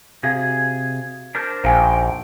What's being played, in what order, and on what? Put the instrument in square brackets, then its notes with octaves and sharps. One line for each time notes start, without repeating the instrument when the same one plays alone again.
[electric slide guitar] C3 G#4 [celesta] F#4 F5
[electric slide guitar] D4 A#4 C5
[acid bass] A#1 [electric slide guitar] D#4 G5 [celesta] C5 F5 G#5